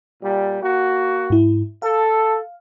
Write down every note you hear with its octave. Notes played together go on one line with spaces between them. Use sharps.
A#2 G3
A#3 F#4
G#2 E4
A4 F5